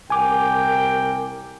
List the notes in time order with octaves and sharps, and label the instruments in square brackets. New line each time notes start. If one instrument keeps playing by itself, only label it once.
[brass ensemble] C2 A#4 G5 [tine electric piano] G#5 D6